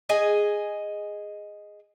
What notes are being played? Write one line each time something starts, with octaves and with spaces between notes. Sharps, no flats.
G#4 D#5 G#5